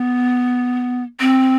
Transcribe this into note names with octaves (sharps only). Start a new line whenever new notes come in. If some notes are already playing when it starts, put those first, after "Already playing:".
Already playing: B3
C4